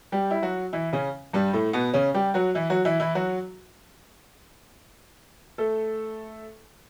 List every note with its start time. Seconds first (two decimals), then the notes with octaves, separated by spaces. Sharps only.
0.12 G3 G4
0.31 E4
0.42 F#3 F#4
0.73 E3 E4
0.93 C#3 C#4
1.33 G2 G3
1.53 A2 A3
1.73 B2 B3
1.94 C#3 C#4
2.14 G3 G4
2.34 F#3 F#4
2.55 E3 E4
2.70 F#3 F#4
2.85 E3 E4
3.00 E3 E4
3.15 F#3 F#4
5.58 A3 A4